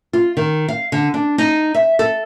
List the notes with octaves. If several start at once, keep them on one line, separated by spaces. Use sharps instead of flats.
F4
D#3
F5
D3
D4
D#4
E5
A4